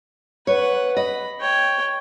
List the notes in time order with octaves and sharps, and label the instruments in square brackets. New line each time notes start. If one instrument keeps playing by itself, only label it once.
[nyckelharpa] B4 F#5 [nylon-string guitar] C#5
[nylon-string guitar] D#5 [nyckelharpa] B5
[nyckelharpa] C#5 G5